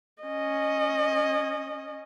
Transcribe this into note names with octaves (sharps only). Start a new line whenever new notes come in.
C#4 D#5